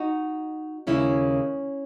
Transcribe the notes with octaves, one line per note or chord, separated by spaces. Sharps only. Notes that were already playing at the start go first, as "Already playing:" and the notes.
Already playing: D#4 F#4
D#2 C#3 G#3 C#4 E4